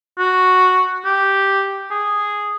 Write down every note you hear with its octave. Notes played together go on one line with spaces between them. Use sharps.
F#4
G4
G#4